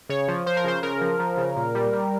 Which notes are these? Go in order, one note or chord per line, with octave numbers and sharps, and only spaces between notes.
C#3 C#5
F3
F3 C5
A#4
C#3 C5
C#3 A#4
F3
F3
C#3
A#2
G3
G3